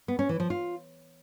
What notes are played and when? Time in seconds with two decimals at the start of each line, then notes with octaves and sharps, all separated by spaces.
0.08 B3
0.19 C#4
0.29 E3
0.40 F3
0.50 F4